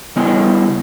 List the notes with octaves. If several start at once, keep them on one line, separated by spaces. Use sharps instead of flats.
C#3 G3 B3 E4 D#5 G#5